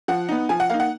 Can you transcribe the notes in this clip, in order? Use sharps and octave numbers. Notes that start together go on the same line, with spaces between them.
F3 F#5
B3 D#4
F3 G#5
F#5
A#3 D#4 F5
F#5